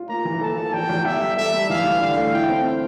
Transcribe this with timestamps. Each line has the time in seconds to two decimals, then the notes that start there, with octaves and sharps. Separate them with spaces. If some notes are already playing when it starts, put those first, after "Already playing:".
Already playing: F4
0.09 A#3 A#5
0.25 E3
0.41 A4 A5
0.58 A4
0.74 E2 G5
0.89 E2
1.05 G4 E5
1.22 G3
1.37 A4 E5
1.53 G3
1.69 E3 F5
1.85 E3
2.01 D3 F5
2.17 A3
2.34 E4 G5
2.49 C4